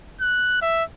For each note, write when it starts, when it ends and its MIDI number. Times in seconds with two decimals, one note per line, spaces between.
0.20 0.57 90
0.61 0.84 76